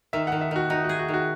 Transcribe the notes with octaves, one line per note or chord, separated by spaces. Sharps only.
D#3 E5
D#3 F#5
E5
D#3 F#4
D#4 F#4
F#4
G#4
F#4
D#3
F#4